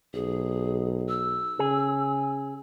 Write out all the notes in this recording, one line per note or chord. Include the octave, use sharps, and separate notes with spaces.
B1 G#4
E6
C#3 G#4